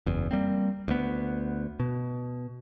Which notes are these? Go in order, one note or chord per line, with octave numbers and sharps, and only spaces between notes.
F#1 E2
G3 A#3 C4
D2 B3
B2